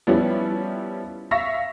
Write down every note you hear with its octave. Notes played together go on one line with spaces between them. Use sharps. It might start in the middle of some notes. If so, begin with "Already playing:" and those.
F3 G3 B3 C#4 E4
E5 F5 C#6 A#6